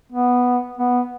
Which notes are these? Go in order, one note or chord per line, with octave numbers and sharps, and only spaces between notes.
B3
B3